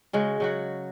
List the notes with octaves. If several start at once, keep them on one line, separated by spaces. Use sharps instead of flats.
C#3 G#3 F#4
C#3 F#3 F#4